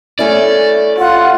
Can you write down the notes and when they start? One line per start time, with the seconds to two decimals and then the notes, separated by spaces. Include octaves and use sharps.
0.19 A3 C#4 E4 D5
0.99 F4 F#5